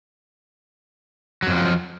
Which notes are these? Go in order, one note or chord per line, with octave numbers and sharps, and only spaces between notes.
F2 F3 F#3